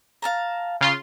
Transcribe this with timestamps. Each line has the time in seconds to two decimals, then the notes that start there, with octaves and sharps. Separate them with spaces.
0.22 F5 A5 A#5
0.81 C#3 F4 C6